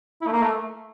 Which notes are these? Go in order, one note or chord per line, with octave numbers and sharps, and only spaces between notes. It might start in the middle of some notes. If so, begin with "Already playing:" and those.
E4
A3
A#3
A3